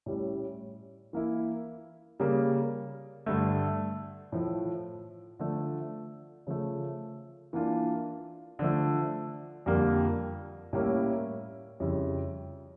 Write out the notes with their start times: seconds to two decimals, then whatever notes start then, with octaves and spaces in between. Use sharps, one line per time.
0.06 A2 G3 C#4
1.13 E3 A#3 E4
2.20 C#3 G3 A#3
3.26 G2 D3 A3
4.32 A2 F3 A3
5.39 D3 F3 A3
6.47 C#3 F3 A3
7.53 E3 A#3 D4 F4
8.59 D3 F3 A3
9.66 F2 D3 G3 A#3
10.73 A2 G3 A#3 C#4 E4
11.80 F2 C#3 G3 C#4 E4